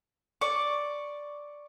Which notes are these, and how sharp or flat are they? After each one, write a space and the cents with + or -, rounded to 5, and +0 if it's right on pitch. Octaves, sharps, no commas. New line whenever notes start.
D5 +0 C#6 +0